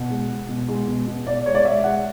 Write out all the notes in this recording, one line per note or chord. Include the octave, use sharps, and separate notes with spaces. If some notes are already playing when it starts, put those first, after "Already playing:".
Already playing: B2 F#5
G#3
G#3
B2
G#3
B2
B2
B2 D5
G#3 C#5
D5
G#3 E5
G#3 F#5